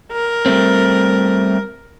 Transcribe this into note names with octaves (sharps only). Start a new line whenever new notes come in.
A#4
G3 A3 C4